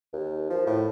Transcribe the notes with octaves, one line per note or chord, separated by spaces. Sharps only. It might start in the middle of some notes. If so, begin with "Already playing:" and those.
D#2
F3
A2